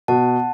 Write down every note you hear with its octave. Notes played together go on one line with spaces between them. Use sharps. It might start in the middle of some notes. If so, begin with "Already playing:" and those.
B2 F#5 A5